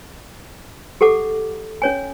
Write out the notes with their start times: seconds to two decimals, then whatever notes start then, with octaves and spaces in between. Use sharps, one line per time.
1.01 G4 A4 F#5 D6
1.82 C#4 C#5 G#5